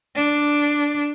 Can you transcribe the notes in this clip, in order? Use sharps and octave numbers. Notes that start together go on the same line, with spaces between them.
D4